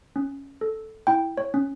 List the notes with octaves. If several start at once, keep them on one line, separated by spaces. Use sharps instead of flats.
C#4
A4
E4 G5
C#5
C#4